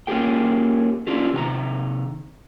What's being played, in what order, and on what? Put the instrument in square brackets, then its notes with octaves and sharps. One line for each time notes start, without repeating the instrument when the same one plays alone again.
[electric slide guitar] A#3 C#4 F4 G4 G#4 G5
C#4 D4 F4 G4
C3 D#3 G#5 A#5